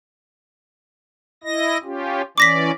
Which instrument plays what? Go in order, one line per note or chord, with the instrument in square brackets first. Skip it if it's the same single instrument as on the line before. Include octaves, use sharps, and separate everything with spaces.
[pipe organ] E4 D#5 A#6
C#4 F4 G4
[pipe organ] E3 C#4 D5 [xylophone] D6 A#6 B6